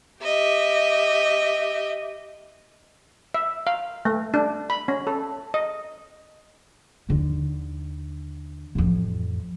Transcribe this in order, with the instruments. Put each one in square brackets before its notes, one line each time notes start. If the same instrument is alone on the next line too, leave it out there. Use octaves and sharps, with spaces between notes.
[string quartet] G4 D#5 E5
[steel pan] E5
F5
A3
D4
B5
C#4
A4
D#5
[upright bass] D#2 D3
A1 F2